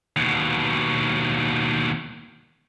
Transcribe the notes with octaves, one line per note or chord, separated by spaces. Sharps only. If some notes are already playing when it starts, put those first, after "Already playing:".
D#2 B2